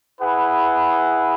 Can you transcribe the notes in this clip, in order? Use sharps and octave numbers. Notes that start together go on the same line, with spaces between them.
E4 G#4 B4 F#5